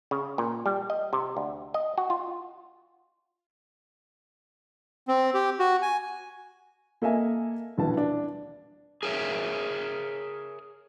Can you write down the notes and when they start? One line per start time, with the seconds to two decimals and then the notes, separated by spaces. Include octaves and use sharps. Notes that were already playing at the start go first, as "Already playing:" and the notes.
0.11 C#3
0.38 A#2
0.66 G3
0.90 D#5
1.13 C3
1.37 D2
1.74 D#5
1.98 F#4
2.10 F4
5.08 C4
5.34 G4
5.59 F#4
5.82 G#5
7.02 A#3 A4 D#5 E5 G#5
7.77 D#1 A#1 B2 E3 B3 A5
7.97 D4
9.03 G#4 A#4 C#5 E5